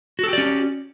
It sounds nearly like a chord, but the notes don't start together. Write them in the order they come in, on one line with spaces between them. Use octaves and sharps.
F#4 A4 G4 D5 C#4